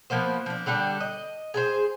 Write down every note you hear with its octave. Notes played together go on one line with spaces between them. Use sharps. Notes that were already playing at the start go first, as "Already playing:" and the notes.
F3 A#3 B3 C5
F3 D4
D3 G3 D4 G4
D#5
G#4 A4 C5